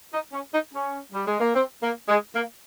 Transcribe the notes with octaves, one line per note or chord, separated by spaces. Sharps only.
D#4
C#4
D#4
C#4
G3
G#3
A#3
C4
A#3
G#3
A#3